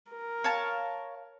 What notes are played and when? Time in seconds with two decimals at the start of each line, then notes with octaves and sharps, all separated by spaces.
0.12 A#4
0.44 C#5 F5 A5